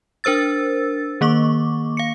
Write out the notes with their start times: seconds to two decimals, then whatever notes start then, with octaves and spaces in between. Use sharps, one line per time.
0.24 D4 A#4 C5 E6 A6
1.21 D#3 A#3 C#6 D6
1.97 F5 C#7